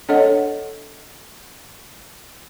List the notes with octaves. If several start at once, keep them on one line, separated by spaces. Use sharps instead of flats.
D4 A4 C#5 D#5 F#5